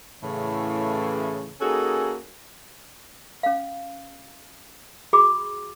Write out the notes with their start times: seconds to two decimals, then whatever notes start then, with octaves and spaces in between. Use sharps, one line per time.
0.22 A2 C#3 E3
1.60 A#3 C#4 D#4 F#4 G#4 A4
3.43 C#4 F5
5.13 F#4 G#4 B5 D6